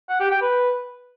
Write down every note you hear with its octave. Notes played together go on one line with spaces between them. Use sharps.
F#5
G4
G5
B4